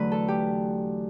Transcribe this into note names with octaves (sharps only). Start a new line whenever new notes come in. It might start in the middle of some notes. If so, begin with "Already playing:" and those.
Already playing: E2 D3 F#3 A3 B4
A4
G4